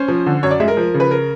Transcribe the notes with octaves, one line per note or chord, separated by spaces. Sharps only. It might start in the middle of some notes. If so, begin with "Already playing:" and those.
Already playing: C#4 C5
F3
D3
F#2 C#5
D5
G#3 E5
A#4
F3
C#3
B4
A#4